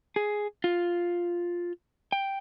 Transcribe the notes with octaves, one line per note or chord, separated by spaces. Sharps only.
G#4
F4
G5